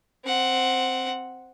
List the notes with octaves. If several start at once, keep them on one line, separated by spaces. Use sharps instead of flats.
C4 F#5